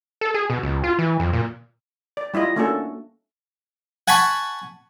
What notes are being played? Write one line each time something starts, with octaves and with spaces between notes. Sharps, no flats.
A4
G#4
B2
C#2
F4
E3
F2
A#2
D5
G3 E4 F4 D#5
A3 A#3 C#4 D4 F#4 A4
F#5 G#5 A5 B5 C#6